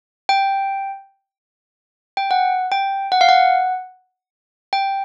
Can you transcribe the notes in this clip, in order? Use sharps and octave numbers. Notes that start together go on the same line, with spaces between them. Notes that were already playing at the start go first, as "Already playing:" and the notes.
G5
G5
F#5
G5
F#5
F5
F#5
G5